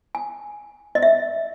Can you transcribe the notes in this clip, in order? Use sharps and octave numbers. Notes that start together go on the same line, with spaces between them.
G#5
D#5
E5